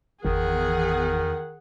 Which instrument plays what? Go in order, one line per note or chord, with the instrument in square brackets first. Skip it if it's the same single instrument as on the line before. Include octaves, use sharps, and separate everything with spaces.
[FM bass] G1 [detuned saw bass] E2 [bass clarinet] D#3 [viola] G#4 F#5